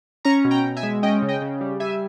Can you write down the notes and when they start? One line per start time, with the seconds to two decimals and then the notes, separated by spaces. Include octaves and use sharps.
0.25 C#4 A#5 C#6
0.44 B2
0.51 G5 A#5
0.64 B2
0.77 E5 G#5
0.83 G#3
1.03 C#4 D#5 G5
1.22 C#3
1.29 D#5 G5
1.42 C#3
1.61 G3
1.80 G3 E5 G#5